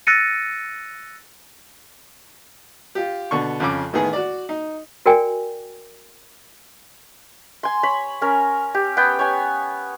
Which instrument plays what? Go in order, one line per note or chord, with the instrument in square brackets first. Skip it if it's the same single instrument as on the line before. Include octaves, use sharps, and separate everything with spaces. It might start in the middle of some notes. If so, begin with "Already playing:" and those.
[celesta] E6 F#6 A6 A#6 C#7 D#7
[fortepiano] F4 G4
B2 D3 C#6
F2 C#3 D6
A1 D#3 B3 G#4
F#4 D5
D#4
[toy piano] F#4 A#4 D5 G5 G#5
[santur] G#5 C6
C#5 B5
C#4 A#4
G4
B3 G5
C#5 G#5